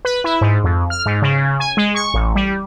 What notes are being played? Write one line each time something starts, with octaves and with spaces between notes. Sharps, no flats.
B4
E4
G#2
F2
F6
G#2
C#3
G#5
G#3
C#6
A1
G3